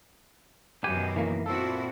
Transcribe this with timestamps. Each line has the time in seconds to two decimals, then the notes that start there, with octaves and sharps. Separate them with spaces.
0.84 F#2 B2 D#3 B3 G4 G#5
1.16 E3 A#3
1.46 A#2 C4 E4 F#4 A4